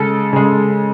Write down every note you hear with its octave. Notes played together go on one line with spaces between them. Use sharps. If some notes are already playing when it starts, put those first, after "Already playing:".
Already playing: C#3 G#3 A4
C#3 G#3